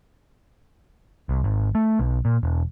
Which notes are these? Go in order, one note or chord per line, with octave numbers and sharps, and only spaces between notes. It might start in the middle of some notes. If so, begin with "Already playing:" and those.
C2
G#1
A3
B1
A#2
E1